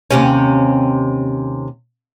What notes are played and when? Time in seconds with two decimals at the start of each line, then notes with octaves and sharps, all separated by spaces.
0.11 D#2 C3 C#4